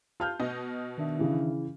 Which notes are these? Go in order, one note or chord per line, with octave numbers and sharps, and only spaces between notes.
F4 A5 F6 G6
B2 D#5
D#3 D4 E5
C#3 E3